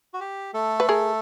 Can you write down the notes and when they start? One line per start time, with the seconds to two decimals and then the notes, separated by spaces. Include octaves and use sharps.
0.14 F#4
0.20 G4
0.54 A3 A4
0.80 B4
0.89 G#4 A#4